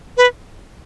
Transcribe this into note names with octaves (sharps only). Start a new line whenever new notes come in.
B4